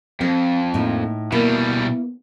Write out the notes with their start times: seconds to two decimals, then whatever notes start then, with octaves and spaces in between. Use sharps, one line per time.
0.21 F2 C4
0.74 A2 A#3 D#4
1.32 B2 G3 A#3 B3 E4